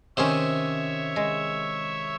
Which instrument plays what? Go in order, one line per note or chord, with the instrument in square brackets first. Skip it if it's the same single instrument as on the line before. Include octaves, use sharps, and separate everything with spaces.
[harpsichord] C3 D#3 [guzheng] C#4 C5 [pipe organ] C#5 E5
[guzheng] G#3